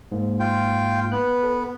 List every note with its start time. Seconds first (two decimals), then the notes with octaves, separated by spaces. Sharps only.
0.12 G#2 A#3
0.40 F4 G5
1.12 B3 F#6
1.43 A4 B4